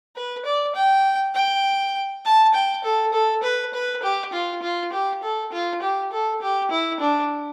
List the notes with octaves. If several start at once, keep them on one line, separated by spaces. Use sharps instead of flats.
B4
D5
G5
G5
A5
G5
A4
A4
B4
B4
G4
F4
F4
G4
A4
F4
G4
A4
G4
E4
D4